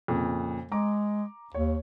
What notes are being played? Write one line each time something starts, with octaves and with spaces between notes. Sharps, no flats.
F2 A#2 C#3
G#3 A#5 D6
D#2 C#5